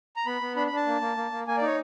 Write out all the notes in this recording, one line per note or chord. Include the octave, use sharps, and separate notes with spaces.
A#5
B3 B5
B3
D4 B5
B5
D4
A5
A#3
A#3
A#3
A#3
A#3 G#5
D5
D#4 C#5